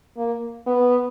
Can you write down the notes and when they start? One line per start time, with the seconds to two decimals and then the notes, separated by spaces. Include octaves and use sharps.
0.17 A#3
0.66 B3